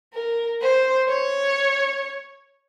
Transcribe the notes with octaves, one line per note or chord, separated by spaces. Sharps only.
A#4
C5
C#5